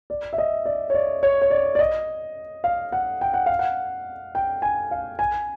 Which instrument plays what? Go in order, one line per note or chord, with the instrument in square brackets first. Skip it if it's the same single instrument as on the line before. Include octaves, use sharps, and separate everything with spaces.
[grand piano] D5
E5
D#5
D5
C#5
D5
C#5
C#5
D5
D5
D#5
F5
F#5
G5
F#5
F5
F#5
G5
G#5
F5
G#5